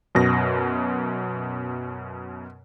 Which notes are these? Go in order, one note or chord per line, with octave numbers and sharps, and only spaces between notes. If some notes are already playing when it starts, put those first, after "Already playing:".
F#2 B2 A#6